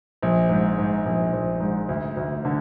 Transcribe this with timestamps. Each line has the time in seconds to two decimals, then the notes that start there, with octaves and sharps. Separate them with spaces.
0.22 A#1
0.49 G#2
0.78 G#2
1.06 A#1
1.33 A#1
1.60 G#2
1.89 D2
2.17 D2
2.45 D3